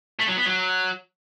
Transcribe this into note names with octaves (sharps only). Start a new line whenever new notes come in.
A3
F#3
B3
F#3